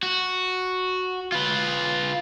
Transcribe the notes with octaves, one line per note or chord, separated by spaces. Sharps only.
F#4
F4 B4